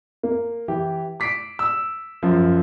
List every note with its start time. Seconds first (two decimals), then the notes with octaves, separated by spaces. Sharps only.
0.23 A#3
0.68 E3 G4
1.20 D6 B6 C7 D7
1.59 E6
2.23 F#2 F3